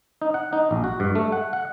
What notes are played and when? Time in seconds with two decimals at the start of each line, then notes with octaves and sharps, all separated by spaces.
0.22 D#4
0.34 F#5
0.53 D#4
0.71 A#1
0.84 F#4
1.00 G2
1.15 A3
1.32 F#5
1.53 F#5